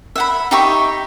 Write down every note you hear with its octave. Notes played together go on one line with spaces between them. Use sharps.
E5 F#5 B5
D#4 G4 E5 C#6